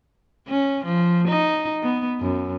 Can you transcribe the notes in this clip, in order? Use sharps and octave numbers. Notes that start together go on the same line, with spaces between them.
C#4
F3
D#4
B3
F#2